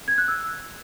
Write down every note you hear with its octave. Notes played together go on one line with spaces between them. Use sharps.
G#6
F#6
E6